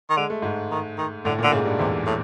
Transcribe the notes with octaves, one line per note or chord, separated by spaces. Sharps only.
D#3
D3 G#3
A3
G#2 G#3
D#3
D#3
A2 D3 A3
A#2 D3 A#3
G#2 C#3 G#3
G2 G3
E2 C3 E3
A2